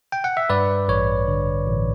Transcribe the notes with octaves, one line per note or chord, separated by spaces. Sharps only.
G5
F#5
E5
G2 B4 D5
A1 C#5
D3
A1